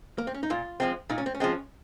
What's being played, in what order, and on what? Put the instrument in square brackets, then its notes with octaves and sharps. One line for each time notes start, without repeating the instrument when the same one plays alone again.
[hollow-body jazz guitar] A#3
C4
C#4
D#4
[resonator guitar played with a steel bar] A#2 [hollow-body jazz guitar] F4
[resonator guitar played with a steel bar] F3 G#3 C4
[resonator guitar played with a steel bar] A#2 [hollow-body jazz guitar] D#4
[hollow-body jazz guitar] C#4
C4
C#4
[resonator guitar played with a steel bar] F3 G#3 C4